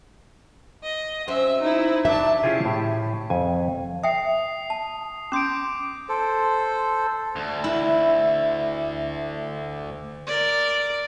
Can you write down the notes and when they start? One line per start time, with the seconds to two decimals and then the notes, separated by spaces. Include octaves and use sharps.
0.83 D#5
1.28 F#3 C4 C#4 E5
1.61 D#4 E4
2.05 F#3 D4 E5 A5
2.43 C#4 E4 F4 G4 G#4 G#5
2.65 A2 G4
3.30 F2 G#5
4.04 E5 G5 D#6 C7
4.70 A5
5.32 C#4 C6 D6 G6 D7
6.09 A4 C5
7.36 D2
7.64 E4
10.27 A#4 D5